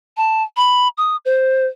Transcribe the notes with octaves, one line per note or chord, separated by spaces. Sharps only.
A5
B5
D#6
C5